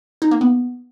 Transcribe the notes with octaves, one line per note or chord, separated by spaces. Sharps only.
D#4
A#3
B3